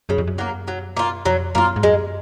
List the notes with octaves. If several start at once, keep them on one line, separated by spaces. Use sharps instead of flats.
F#2 C#3
F2
F#2
F#3 A#3
F#3
A#3 F4
F2 F#3
F#2 A#3 F4
G#2
F#2 G#3